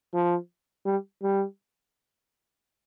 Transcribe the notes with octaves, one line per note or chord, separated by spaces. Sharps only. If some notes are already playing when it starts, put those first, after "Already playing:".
F3
G3
G3